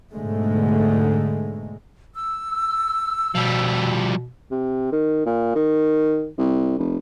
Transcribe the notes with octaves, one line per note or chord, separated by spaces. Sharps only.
G#2 B2 D3 G#3 A3
E6
B2 F3 G3
C3
D#3
A#2
D#3
C2
F1